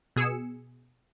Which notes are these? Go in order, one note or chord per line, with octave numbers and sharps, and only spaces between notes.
B2 G#4 E6 C#7